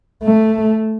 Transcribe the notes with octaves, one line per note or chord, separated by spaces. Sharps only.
A3